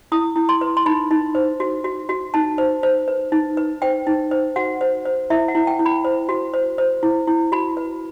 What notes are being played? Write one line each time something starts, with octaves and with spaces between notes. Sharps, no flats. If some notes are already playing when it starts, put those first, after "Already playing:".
E4 D#6
E4
C6
B4
C6
D#4 B5
D#4
C5
F#4
F#4
F#4
D#4 A5
C5
C5
B4
D#4
B4
C5 G5
D#4
C5
F#4 F#5
C5
C5
E4 E5
F#5
E4
G5
E4
B5
C5
F#4
C5
C5
E4
E4
F#4 B5
B4